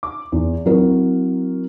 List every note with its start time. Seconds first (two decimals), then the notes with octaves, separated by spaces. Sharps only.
0.03 D6
0.32 E2
0.66 F#3 C4 E4 A#4